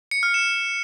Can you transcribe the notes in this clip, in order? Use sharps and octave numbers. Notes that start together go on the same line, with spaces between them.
C#7
F6
E7